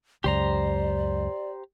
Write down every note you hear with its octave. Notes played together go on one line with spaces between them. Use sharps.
C#2 F#2 G4 C5 D5 A#5